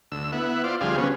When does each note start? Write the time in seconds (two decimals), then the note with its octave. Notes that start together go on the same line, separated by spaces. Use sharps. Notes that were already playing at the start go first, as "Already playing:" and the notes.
0.12 D2 E6
0.32 B3 E4 F#5
0.64 F4 C5 D5
0.81 D2 F3 G3 C4 G#4 F5
0.98 C#3 F#3 B3 C#4